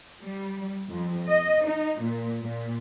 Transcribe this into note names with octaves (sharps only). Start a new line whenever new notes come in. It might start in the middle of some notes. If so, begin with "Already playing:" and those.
G3
F2
D#5
D#4
A#2
A#2